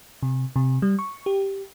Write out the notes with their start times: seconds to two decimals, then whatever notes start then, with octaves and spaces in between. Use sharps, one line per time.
0.23 C3
0.56 C3
0.82 G3
0.99 C#6
1.26 G4